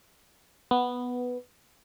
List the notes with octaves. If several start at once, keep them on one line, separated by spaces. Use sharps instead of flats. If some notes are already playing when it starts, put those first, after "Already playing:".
B3